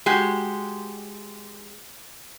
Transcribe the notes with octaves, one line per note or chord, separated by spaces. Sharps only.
G#3 F#4 G4